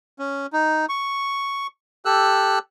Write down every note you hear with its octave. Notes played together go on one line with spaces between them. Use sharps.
C#4
D#4
C#6
G4 A4 E6 F#6